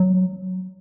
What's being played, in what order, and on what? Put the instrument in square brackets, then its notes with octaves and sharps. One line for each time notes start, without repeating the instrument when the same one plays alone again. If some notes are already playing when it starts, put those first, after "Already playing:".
Already playing: [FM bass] F#3